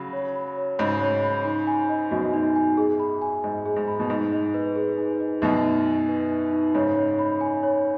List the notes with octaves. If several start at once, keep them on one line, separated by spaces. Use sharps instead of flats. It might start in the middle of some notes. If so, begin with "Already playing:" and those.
Already playing: C#3 F#3 B5
C#5
B5
C#5
G#2 C#3 B5
C#5
B5
D#4
G#5
D#5
F#2 B2 F#4
D#4
G#5
G#4
B5
G#5
G#2 D#5
G#4
G#2
B5
B2
G#2 D#4
D#5
B4
G#4
D#4
D#5
F#2 B2 D#4
D#4
G#5
B4
D#4
D#4
G#2 C#3 C#5
C#5
B5
G#5
C#5